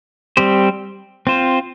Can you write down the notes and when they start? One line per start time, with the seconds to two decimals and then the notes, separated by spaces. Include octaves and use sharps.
0.37 G3 C4 G4 C5
1.27 C4 F4 C5